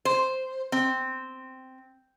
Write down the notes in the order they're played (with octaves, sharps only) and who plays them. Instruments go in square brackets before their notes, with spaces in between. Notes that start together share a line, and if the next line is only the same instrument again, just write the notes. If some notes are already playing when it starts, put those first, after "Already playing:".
[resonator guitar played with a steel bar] C5
C4